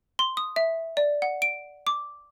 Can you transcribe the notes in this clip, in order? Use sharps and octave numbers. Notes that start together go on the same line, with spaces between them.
C6
D#6
E5
D5
F#5
D7
D6